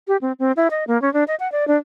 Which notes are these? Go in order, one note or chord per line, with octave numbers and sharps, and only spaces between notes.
G4
C4
C4
E4
D#5
A#3
C#4
D4
D#5
F#5
D5
D4